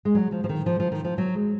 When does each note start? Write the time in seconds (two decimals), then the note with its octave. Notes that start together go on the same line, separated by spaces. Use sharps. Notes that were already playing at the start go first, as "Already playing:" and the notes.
0.05 G#3
0.15 F#3
0.32 F3
0.44 F3
0.49 D#3
0.66 F3
0.80 F3
0.92 D#3
1.04 F3
1.18 F#3
1.35 G#3